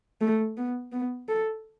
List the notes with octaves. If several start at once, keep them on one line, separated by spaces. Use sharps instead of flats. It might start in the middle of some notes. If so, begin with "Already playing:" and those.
A3
B3
B3
A4